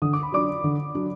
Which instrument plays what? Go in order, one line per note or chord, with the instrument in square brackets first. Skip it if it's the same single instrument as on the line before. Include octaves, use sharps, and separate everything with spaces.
[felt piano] D3 [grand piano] D#6
[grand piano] D6
B5
[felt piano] F#3 D4 [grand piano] D5 D6
[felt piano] D3
F#3 D4